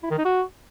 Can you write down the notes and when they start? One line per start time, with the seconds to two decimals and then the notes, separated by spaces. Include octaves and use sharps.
0.03 E4
0.10 D#3
0.18 D#4
0.25 F#4